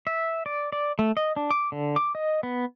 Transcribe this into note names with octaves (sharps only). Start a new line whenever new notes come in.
E5
D5
D5
A3
D#5
D4
D6
D3
D6
D#5
B3